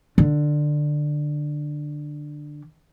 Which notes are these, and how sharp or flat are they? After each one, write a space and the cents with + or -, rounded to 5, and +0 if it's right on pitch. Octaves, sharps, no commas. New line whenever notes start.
D3 +15